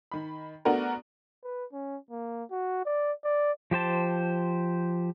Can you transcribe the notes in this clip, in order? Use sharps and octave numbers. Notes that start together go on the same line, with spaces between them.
D#3 B5
A3 B3 D4 F#4 A#4
B4
C#4
A#3
F#4
D5
D5
F3 G4 C5 A5